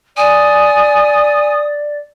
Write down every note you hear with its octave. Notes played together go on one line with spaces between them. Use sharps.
D5 G#5 D#6